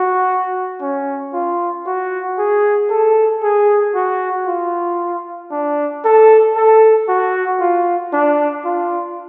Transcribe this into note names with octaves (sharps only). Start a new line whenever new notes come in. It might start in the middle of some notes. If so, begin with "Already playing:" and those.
Already playing: F#4
C#4
F4
F#4
G#4
A4
G#4
F#4
F4
D4
A4
A4
F#4
F4
D4
F4